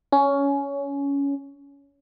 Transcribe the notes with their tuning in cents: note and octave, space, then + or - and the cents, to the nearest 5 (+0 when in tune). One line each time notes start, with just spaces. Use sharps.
C#4 +15